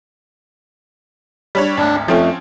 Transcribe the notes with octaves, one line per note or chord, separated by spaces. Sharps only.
G3 D4 C#5
G#1 D2 D4
F2 F3 A3 C4 C#4